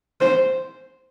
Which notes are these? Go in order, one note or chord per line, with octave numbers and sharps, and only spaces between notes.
C5